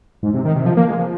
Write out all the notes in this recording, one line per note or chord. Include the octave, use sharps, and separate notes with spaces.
G#2
C3
D#3
C3
F3
A#3
G#3
F3